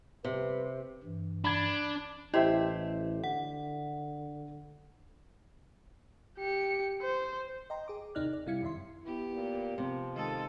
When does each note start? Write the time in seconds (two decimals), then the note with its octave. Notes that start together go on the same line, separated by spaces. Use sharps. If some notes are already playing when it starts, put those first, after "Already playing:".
0.25 F2 C3 G3 B4
1.03 G2 E3
1.44 D4 B5 G#6
2.34 A1 E4 G4 C5 D#5 E5
3.24 D3 F#5
6.38 G4 C#7
7.02 C5
7.70 D#5 G5 A#5 C6
7.88 G#4 D6
8.15 D#2 C3 D#4 D5 F6 F#6
8.33 D5
8.46 C3 G3 E4 F5 G#6 C#7
8.62 F#2 D#3 E5 C6
9.04 B3 E4 G4
9.33 A#2
9.78 C3 F3
10.14 D#3 G#3 A4